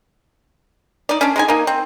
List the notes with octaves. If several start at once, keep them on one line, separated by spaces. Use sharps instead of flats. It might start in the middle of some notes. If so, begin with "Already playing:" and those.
D#4 D5
C#4 D4
G#3 D#4 G#5
A#3 D#4
C4